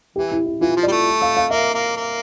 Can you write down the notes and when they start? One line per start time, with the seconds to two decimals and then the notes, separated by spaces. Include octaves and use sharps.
0.16 E3 G4
0.32 E4
0.46 E4
0.61 E3 F4
0.76 F3
0.83 D5
0.87 G3
0.91 A3
1.22 F5
1.37 F5
1.51 A#3 E5
1.74 A#3
1.97 A#3